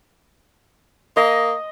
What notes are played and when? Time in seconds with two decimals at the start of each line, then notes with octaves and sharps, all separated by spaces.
1.17 A#3 D#5